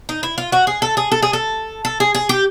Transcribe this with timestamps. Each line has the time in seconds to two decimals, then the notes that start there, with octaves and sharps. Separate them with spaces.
0.09 D#4
0.23 E4
0.38 F4
0.52 F#4
0.67 G#4
0.82 A4
0.97 G#4
1.12 A4
1.23 G#4
1.33 A4
1.85 A4
2.00 G#4
2.15 G#4
2.29 G4